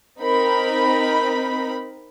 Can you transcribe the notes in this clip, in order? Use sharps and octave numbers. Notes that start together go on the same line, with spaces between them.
C4 D#4 A#4 B5